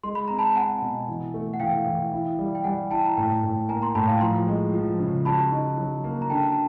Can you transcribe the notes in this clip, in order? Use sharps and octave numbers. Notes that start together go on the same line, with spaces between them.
G#3 C6
B5
C4 A#5
A5 B5
C4 F#5 G#5
B2
E3
A3
F#5
E3 F5 G5
E3
E4
G3
G5
G3 F#5 G#5
E4 G5 A5
A#5
A2 G5 A5
A2
A#3 G#5 A#5
A#5 C6
A2 A5 B5
F5 G5
F3 A#5 C6
G#3
F3
C#3
F#4 A5 B5
D#4
F#3
A#3
A#5
D3 G5 A5
A5